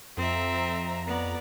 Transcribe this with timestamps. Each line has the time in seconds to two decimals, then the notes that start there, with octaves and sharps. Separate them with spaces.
0.17 F2 C4 E5 A#5
1.07 B3 D5